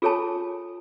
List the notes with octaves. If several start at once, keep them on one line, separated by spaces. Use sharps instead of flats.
F4 G#4 A4 C#5 G#5 A5